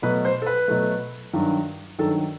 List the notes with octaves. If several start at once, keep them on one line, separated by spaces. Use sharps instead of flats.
B2 F#3 A3 B4
C5
A4
B4
B2 F#3 A3
G2 D#3 F#3
G2 D#3 F#3 A4